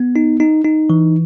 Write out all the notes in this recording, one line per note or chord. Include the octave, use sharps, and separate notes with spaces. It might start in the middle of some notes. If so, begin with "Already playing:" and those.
Already playing: B3
D#4
D#4
D#4
E3